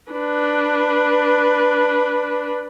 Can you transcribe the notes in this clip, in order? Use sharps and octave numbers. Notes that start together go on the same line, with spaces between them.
D4 B4